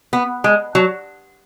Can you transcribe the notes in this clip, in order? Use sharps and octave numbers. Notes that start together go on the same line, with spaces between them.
B3
G#3
F#3